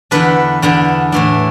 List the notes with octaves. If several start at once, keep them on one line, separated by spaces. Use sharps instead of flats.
E2 D3 B3 D4 B4
E2 D3 B3 D4
A2 E3 A3 D4